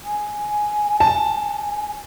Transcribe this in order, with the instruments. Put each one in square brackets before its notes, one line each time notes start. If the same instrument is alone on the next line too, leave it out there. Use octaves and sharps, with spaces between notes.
[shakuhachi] G#5
[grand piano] A5